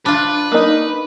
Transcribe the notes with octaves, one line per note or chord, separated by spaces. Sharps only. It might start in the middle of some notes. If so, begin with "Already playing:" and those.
D4 F4 B4
A#3 D#4